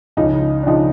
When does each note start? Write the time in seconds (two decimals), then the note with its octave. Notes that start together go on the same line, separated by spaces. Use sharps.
0.17 C#2 C#3 F3 D#4
0.63 D4
0.67 C#3 F3 D#4